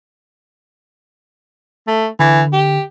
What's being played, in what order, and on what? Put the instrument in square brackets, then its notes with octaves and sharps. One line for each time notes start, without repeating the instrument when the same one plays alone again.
[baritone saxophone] A3
[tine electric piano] D3 [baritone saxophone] E3
[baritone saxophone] G4